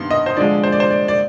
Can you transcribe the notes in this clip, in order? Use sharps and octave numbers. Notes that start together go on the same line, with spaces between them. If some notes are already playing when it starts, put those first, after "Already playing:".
Already playing: G2 D#3 B3 C6
D#5
C5
D3 F3 G#3 D5
C5
D5
C5
D5
D5